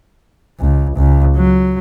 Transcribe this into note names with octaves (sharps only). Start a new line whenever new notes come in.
C#2
C#2
F#3